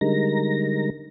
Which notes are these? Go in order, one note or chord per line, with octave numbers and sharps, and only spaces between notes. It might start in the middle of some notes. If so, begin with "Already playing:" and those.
D3 G3 G#3 D#4 A#4 A#6